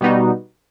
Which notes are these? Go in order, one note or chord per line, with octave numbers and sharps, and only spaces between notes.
B2 G3 B3 D#4 F#4